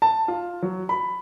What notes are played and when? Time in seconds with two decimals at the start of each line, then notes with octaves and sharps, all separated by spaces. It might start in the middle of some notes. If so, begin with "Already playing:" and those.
0.02 A5
0.28 F4
0.62 F#3
0.89 B5